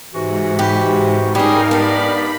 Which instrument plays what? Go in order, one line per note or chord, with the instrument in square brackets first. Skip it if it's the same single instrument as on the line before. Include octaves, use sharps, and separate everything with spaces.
[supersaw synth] G#2 [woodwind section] C3 E3 F#4
[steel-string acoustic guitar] G4 B4
[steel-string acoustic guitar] G3 C#4 [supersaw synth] D#4 A#4 F5 [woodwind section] G4 G#4
[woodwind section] G2 B3 D5 [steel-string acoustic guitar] D4 G4 [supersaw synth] B5